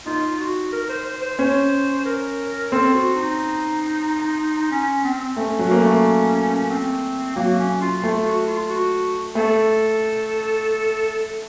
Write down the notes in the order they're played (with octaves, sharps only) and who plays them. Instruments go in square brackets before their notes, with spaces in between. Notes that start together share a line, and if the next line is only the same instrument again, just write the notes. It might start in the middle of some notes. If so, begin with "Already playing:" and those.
[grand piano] D#4 [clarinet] F4
[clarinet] F#4
A#4
C5
C5
C5
[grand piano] C#4 [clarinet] C5
[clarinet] A#4
[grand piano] C4 [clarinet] A4
[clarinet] F#4
D#4
C#4
C4
[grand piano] A3 [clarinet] C#4
[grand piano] F#3
A#3
A3
[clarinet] C4
[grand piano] F#3 [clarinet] A#3
[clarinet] C#4
F4
[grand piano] A3 [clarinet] F4
[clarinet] F#4
F4
F#4
[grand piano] A3 [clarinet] A4